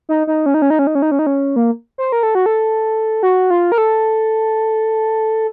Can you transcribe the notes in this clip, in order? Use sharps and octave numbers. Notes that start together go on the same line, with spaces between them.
D#4
D#4
C#4
D#4
C#4
D#4
C#4
D#4
C#4
D#4
C#4
D#4
C#4
A#3
C5
A#4
A4
F#4
A4
F#4
F4
A#4
A4